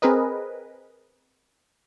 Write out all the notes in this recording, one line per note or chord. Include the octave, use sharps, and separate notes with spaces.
C4 G#4 A#4 B4 D#5